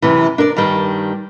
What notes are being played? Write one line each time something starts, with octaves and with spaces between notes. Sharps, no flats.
F#2 C3 E3
D4 A#4 B4 D5
G2 D#3 G3